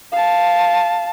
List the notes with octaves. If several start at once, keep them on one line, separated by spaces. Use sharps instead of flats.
F5 A5